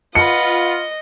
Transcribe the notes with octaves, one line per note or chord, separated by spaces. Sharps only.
F4 B4 D#5 F#5 C#7